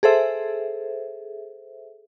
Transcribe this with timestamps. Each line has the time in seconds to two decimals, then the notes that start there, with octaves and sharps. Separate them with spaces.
0.03 G#4 A4 C5 E5